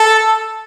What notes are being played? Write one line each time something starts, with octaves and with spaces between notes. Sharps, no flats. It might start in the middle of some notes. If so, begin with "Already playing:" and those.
Already playing: A4